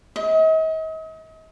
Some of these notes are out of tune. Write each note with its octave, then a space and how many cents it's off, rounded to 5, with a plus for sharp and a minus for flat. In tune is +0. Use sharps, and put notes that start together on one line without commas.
D#5 +40